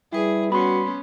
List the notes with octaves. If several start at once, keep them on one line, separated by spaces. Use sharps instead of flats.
G3 E4 G#4 B4 D5
B3 C#4 F#4 B5 C6